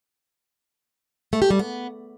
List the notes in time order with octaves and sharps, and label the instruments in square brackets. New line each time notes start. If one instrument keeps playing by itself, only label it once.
[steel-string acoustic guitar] A3
G4
G3
B3